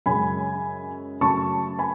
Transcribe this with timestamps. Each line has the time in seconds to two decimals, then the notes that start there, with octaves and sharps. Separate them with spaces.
0.06 F#2 C#3 G#3 G#5 B5
1.21 F#2 C#3 F#3 A3 A5 C#6
1.79 G#5 B5